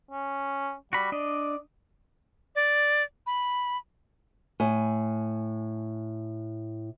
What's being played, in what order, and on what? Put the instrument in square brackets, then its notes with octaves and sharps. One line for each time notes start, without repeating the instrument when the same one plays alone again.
[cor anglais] C#4
[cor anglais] G3 [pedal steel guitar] F#4 B5
[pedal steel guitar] D4 D#5 [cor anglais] D5
[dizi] D5
B5
[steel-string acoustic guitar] A2 G#5